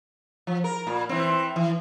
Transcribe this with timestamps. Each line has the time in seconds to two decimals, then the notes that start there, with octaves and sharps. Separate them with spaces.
0.47 F3
0.64 A#4
0.87 A#2
1.09 E3 C4
1.56 E3